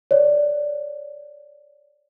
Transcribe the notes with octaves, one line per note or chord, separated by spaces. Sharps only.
C#5 D5